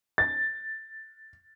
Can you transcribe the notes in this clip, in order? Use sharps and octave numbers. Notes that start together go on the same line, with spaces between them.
A6